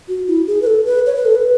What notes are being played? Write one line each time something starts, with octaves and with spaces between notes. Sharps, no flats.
F#4
E4
G#4
B4
A4
B4
C#5
B4
A4
B4